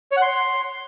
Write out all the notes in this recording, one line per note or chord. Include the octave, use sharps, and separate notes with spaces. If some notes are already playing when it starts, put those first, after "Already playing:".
C#5
F#5
C6